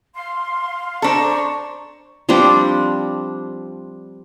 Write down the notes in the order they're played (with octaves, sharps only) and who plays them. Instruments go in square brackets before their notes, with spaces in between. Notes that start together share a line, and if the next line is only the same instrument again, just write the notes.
[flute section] F5 C6
[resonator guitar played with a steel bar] D4 A4 [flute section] C5 A#5 C#6
[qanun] F3 G3 C4 D4